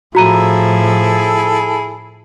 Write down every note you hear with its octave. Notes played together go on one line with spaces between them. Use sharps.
A2 F3 E4 F#4 G#4 A4 A#5 D#7